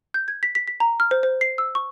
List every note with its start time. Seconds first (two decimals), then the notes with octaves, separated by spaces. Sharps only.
0.14 G6
0.28 G#6
0.43 B6
0.55 B6
0.68 B6
0.80 A#5
1.00 F6
1.11 C5
1.23 C5
1.41 C7
1.58 E6
1.75 C#6